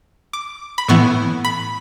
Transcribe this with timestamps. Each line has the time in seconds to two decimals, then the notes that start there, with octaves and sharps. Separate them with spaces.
0.33 D6
0.78 B5
0.88 A2 E3 B3 C#6
1.45 B5